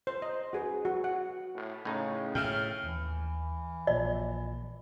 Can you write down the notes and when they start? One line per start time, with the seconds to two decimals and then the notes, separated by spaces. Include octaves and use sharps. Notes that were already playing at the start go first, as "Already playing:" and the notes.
0.07 C5
0.22 D#5
0.53 F#4 G#4 B4
0.85 F#4
1.04 F#5
1.55 A2
1.85 A2 C#3 D#4
2.35 A2 E5 G5 F6
2.83 D#2 E3
3.87 A#1 A#2 D5